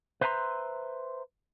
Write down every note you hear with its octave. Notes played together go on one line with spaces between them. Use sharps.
B4 C5 E5 A5 A#5 C6